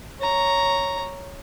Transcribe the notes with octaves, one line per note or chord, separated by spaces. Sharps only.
C#5 A#5